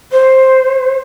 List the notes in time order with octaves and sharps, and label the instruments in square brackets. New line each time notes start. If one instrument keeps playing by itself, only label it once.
[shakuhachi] C5